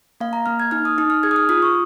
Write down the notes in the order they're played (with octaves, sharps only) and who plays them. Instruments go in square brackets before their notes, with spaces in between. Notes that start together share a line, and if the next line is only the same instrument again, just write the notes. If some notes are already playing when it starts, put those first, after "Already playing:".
[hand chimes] A#3 F5
A#5
A#3 F6
G#6
D#4 F6
D#6
D#4 D#6
F6
G#4 G#6
D#6
F6
F4 D#6
C#6